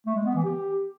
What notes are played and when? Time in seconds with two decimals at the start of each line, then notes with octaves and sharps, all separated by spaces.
0.06 A3
0.16 G#3
0.26 B3
0.35 E3
0.45 G4